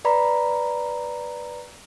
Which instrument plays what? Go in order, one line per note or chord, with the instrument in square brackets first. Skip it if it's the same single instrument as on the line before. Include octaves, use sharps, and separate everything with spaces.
[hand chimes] B4 D5 A#5 B5